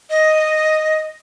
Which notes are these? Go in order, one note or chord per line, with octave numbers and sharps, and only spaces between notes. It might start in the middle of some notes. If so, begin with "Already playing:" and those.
D#5